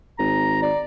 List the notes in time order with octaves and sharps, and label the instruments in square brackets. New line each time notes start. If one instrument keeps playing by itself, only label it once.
[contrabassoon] G#1 [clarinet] A#5
[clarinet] D5